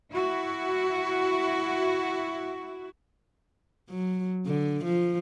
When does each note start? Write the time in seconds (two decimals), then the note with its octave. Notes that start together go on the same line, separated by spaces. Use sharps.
0.12 E4 F#4
3.90 F#3
4.46 D3
4.85 F3